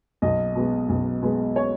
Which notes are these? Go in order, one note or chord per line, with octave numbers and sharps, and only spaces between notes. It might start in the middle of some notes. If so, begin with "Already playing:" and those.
B1 D#5
B2 G#3 B3
B1
B2 G#3 B3
C#5